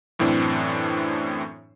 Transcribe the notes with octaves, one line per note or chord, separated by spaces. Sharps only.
F#2 A2 E3 C4 D4